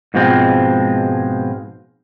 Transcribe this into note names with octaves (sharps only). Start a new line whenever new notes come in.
G#2 B2 F3 G#3 C4